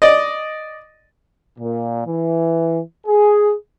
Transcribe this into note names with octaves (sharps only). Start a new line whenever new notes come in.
D5 D#5
A#2
E3
G#4